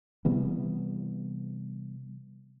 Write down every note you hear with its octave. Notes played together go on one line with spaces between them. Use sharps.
C3 E3 G3 B3